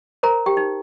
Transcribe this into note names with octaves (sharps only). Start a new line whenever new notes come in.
A#4 C5 A#5
G4 G5
D#4